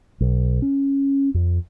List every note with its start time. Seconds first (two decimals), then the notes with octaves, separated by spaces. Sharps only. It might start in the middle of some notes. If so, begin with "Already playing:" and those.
0.21 B1
0.62 C#4
1.34 F2